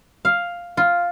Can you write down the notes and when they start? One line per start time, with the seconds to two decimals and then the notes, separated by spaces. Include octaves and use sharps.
0.25 F5
0.77 F4